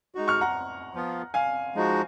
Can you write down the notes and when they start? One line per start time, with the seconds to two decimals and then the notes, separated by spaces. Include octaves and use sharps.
0.15 G#3 D#4 F#4
0.28 C#6 F6
0.41 F#5 A#5
0.94 F3 B3 F4
1.34 F5 G#5
1.75 F3 G#3 D#4 F#4